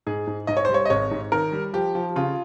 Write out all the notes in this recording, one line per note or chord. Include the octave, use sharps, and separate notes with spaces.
G#2 G#4
G#2
G#2 D#5
C#5
C5
G3
C#5
D#5
G#1 C#5
G#2
D#3 A#4
G3
F3 G4
F3
C#3 F4